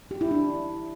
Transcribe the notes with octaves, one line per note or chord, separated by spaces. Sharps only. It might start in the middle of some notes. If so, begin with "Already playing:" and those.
G4
E4
D4